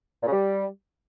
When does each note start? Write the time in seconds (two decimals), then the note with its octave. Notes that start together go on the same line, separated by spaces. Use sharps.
0.22 A#2
0.27 C#3
0.32 G3